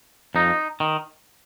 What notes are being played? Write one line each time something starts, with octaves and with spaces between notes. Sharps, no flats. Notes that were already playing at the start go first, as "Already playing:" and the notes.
F2 D#4
D#3